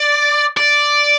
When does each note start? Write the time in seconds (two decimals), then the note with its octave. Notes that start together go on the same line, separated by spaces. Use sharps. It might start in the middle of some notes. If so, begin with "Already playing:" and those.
Already playing: D5
0.57 D5